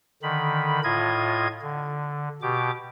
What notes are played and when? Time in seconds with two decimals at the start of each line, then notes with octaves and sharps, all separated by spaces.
0.23 D3 D#3 B5
0.84 A2 F4 D#5 G#6
1.62 D3
2.42 B2 G4 D6